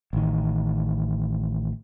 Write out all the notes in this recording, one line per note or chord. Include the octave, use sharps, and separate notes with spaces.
A1 D#3